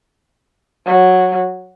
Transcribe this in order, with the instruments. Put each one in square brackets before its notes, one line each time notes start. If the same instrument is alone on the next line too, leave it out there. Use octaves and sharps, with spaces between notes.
[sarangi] F#3